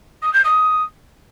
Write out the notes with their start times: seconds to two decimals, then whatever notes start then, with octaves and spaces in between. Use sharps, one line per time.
0.22 D#6
0.33 G6
0.44 D#6